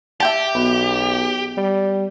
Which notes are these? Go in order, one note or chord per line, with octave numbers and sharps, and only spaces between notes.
G4 E5 G5 A5
B1 B3 F#4
G3